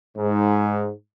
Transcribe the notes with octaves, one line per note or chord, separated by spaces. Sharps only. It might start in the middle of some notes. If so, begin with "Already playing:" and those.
G#2